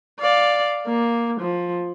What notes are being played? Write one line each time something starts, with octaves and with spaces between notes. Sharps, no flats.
D5 F5
A#3
F3